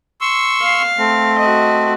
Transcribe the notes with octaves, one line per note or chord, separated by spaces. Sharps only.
C6 C#6 E6
F5
A3 C4
F#4 D#5